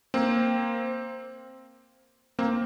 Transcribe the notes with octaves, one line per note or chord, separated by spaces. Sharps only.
A#3 C4
A#3 C4